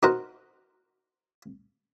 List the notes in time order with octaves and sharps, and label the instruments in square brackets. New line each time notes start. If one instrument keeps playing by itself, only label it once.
[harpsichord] D#4 F#4 A#4 C5 F#5 A#5